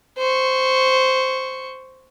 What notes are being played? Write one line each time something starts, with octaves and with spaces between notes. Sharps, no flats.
C5 C#6